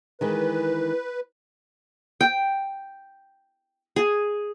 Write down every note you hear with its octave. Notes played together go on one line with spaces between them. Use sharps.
D#3 E3 G#3 B4
G5
G#4